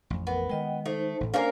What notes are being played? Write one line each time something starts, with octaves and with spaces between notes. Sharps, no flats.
A1 F2
B3 A#4
D#3 G#3 D#5 G5
A3 D#4 C5
A1 A2
A#3 C#4 D4 A#4 C5 D5